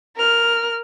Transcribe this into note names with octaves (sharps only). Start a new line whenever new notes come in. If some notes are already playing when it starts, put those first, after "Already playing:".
A#4 F6